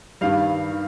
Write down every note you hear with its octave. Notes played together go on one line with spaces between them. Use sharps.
G2 D#3 G3 F5
D#3